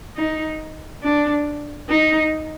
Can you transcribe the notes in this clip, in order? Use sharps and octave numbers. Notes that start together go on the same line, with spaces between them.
D#4
D4
D#4